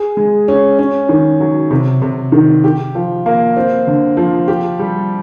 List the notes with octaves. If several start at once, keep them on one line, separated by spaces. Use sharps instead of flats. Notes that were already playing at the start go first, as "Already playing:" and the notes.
Already playing: G#4
G#3
C#4
C#4
D#3
F#3
C3
C3
D#3
G4
F3
A#3
C4
D3
F3
G4
G3